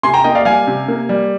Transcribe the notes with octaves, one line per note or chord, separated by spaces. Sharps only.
C3 G#5 C6
G5 A#5
A#3 D#5 G5
D5 F5
G3 F5 G#5
C3
A#3
G3